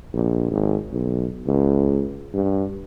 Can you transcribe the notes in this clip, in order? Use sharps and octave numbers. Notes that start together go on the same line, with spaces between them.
A#1
G#1
B1
C#2
G2